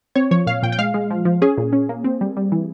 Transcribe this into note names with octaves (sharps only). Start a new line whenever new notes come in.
C4 C#5
F3 C#5
A#2 F5
A#2 G5
G5
G#3 F5
G#3
F3
F3
C#4 G#4
A#2
C#4
A#3
C4
G3
G3
E3